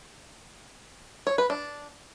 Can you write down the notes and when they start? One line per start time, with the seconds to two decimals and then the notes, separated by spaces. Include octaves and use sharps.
1.27 C#5
1.38 B4
1.50 D4